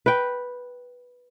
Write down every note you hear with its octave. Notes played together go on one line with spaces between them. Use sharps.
B4 G5